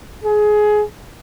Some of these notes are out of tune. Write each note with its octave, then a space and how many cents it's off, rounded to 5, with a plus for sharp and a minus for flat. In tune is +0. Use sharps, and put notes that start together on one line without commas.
G#4 +20